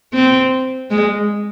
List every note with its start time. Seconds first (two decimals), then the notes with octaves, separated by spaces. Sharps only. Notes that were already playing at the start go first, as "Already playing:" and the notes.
0.13 C4
0.91 G#3